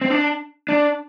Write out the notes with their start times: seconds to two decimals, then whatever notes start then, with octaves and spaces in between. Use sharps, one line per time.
0.01 C4
0.10 D4
0.69 D4